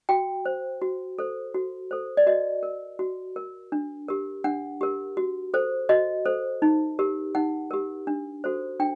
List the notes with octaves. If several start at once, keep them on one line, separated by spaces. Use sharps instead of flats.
F#4 G5
C5
F#4
A4 C5
F#4
A4 C5
D5
F#4 D#5
A#4
F#4
A#4
D4
G4 A#4
D4 F#5
G4 A#4
F#4
A4 C5
F#4 D#5
A4 C5
D#4
G4 A#4
D#4 F#5
G4 A#4
D4
F#4 A4 C5
D4 G5